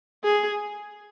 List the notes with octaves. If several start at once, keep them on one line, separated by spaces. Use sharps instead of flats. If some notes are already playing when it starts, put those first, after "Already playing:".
G#4